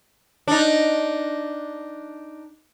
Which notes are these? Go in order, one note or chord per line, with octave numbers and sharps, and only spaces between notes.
D4 D#4